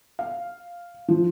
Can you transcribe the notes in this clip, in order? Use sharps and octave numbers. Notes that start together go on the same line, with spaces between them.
F5
F3